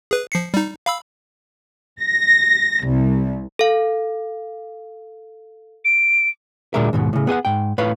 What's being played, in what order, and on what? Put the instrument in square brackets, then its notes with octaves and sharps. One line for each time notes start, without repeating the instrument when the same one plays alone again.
[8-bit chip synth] G#4 B4
F3 C7 C#7
G3 D#4
F5 B5 E6
[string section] A#6
C2
[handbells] A4 F5
[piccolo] D7
[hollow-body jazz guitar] D2 A#2 G#3 D4 A#4 E5
D#2 G#2 B2
A2 C#3
B3 G#4 D#5 F#5
G#2 G5
A2 B4 C#5 F5